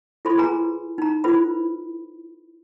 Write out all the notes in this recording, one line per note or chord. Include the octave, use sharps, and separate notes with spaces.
E4 F4 A4 C5 B5 C6
G#4 B4 G#5 A#5
D#4 A#5
E4 F4 A4 B4 C5 B5